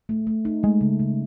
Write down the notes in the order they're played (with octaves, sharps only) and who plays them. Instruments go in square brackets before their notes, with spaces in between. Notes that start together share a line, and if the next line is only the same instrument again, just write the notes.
[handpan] A3
A3
D#4
[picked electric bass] G#3 [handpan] A3
[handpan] C#3
C#3